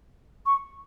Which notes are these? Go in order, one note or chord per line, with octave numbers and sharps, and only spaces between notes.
C#6